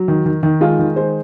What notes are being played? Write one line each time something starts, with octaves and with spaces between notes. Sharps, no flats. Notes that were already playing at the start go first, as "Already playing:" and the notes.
Already playing: F#3
D#3
D#3
D#3
G#3 F4
D#3
G#3 C5